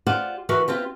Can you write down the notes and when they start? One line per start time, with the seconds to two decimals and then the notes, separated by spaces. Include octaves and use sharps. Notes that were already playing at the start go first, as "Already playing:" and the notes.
0.07 F4 G4 C5 D5 F#5
0.49 E3 F#4 A#4 B4
0.68 B3 C4 F4 G4